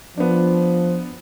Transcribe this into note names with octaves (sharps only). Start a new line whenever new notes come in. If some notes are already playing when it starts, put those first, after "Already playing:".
F3 B3 D4